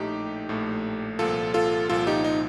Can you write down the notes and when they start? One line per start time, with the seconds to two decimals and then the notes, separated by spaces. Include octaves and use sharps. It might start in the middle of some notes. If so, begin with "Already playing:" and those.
Already playing: A#1 A2 A3 D#4 G4
0.49 A#1 A2 A3
1.19 C2 A#2 F3 F4 A4
1.54 F4 A4
1.90 C2 A#2 F3 F4 A4
2.07 D#4 G4
2.24 D#4